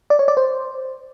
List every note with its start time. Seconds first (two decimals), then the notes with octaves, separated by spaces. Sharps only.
0.10 D5
0.19 C#5
0.28 D5
0.37 C5